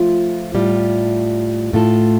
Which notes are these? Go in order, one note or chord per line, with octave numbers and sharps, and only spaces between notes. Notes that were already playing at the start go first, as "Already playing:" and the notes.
Already playing: F3 A3 F4
A2 G3 F4
A2 A3 F4 A4